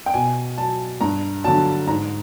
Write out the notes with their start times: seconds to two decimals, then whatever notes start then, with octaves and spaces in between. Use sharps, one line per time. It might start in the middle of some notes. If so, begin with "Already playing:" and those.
0.06 G5
0.14 B2 G#5
0.57 F#3 A5
1.01 G2 A#5
1.44 D3 F#3 A5
1.87 G#2 A#5